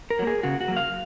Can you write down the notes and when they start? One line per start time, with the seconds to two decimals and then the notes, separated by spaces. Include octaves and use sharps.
0.10 A#4
0.19 F#3
0.22 A#3 G#4
0.43 C#3 F#4
0.61 F#4
0.68 F#3 A#3
0.77 F5